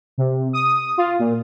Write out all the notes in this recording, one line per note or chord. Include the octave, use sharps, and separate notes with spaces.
C3
D#6
F4
A#2